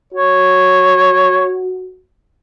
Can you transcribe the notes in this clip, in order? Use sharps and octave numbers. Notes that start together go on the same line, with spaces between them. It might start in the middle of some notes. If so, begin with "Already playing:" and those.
F#4 C#5